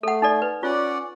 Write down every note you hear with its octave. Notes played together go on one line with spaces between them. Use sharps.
A3 A4 F#5
D#4 A4 D5
B4
C#4 F4 D5 F#5